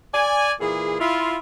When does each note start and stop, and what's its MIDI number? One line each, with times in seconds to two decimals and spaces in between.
0.13 0.52 74
0.13 0.52 80
0.61 0.99 46
0.61 0.99 52
0.61 0.99 68
1.00 1.37 64
1.00 1.37 65